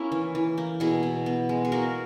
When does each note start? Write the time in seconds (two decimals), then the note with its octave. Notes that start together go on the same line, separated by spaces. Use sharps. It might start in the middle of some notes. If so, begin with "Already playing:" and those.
Already playing: A#3 C#4 E4
0.12 E3
0.35 E3
0.58 A#3
0.80 B2 E4 G#4
1.03 B2
1.26 B3
1.49 G#3
1.65 G#4
1.72 A#3 F#4 A#4